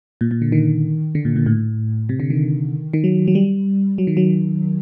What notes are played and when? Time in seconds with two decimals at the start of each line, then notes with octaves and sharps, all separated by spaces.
0.21 A#2
0.31 A#2
0.42 D3
0.52 D#3
1.15 D3
1.25 A#2
1.36 A#2
1.46 A2
2.09 C3
2.20 D3
2.30 D#3
2.94 D#3
3.04 F#3
3.28 F#3
3.35 G3
3.98 F#3
4.07 D#3
4.17 F#3